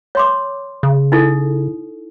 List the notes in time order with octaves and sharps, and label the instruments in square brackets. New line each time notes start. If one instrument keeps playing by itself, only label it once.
[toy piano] C#5 C6 D6
[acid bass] C#3
[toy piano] D#4 E4 A4